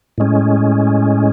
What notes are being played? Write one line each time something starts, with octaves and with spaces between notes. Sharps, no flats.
A2 G#3 C#4